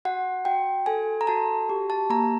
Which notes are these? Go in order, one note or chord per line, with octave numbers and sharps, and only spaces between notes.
F#4 F#5
F#4 G5
A4 G#5
A#5
F#4 A5
G4
A5
A#3 A#5